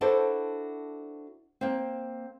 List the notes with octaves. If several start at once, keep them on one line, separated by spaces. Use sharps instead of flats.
D4 E4 F#4 A4 C5 D5
A#3 C4